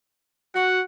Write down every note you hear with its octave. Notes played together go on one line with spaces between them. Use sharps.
F#4 F#5